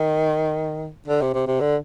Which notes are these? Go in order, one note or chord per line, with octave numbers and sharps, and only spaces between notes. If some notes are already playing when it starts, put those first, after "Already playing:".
Already playing: D#3
D3
C3
C3
C3
D3